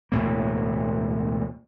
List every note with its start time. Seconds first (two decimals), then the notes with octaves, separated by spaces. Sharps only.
0.12 E1 D2 A2 A#3